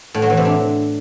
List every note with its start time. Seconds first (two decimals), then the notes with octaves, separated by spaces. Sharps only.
0.14 A2
0.22 F#3
0.30 E3
0.37 C3
0.45 D4